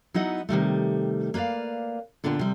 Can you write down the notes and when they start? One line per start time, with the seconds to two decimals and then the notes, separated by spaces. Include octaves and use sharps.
0.14 F#3 B3 D#4 E4 D#5 F#5
0.49 C3 D#3 G3 A3
1.34 A#3 B4 C5 D5 F5
2.24 A#2 D3 B3 D4 G5
2.39 C3 G3